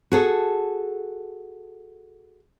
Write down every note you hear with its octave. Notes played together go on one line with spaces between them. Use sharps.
F#4 G#4 A4